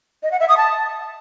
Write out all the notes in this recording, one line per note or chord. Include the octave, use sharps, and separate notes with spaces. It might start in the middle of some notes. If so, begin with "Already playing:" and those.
D#5
F#5
E5
D#6
A5